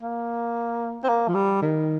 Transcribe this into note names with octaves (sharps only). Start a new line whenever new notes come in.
A#3
C4
A#3
F3
G3
D#3